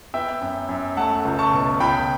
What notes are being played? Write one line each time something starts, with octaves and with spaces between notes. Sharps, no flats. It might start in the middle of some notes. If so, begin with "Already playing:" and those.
B3 E5 G5
F#2
F#2
A3 F#5 A5
C#2
A5 C#6
B2
C#2 G5 B5